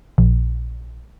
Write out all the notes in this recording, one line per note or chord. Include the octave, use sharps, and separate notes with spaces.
A#1